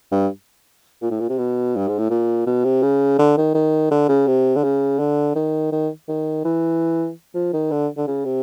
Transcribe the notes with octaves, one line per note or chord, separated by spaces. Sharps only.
G2
A#2
A2
A#2
C3
B2
G2
G#2
A2
A#2
B2
C3
C#3
D3
D#3
D#3
D3
C#3
C3
D3
C#3
D3
D#3
D#3
D#3
E3
F3
D#3
D3
D3
C#3
C3